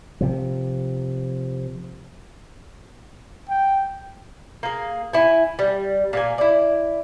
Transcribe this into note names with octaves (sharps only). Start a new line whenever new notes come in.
C3 F3
G5
A#3 G#4
E4 G#5
G3
A#2 A#3 G#5
E4 D5